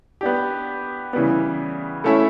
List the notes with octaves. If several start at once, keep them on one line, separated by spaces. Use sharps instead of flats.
B3 D4 G4
C#3 E3 G3 B3
A3 C#4 E4 A4 E5